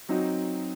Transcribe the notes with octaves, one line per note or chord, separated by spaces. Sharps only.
F#3 C4 D#4 F#4